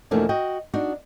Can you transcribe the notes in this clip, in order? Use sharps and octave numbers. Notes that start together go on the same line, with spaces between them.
E2 B2 F3 A3 A#3 D4
F#4 D#5 G5
D4 D#4 F#4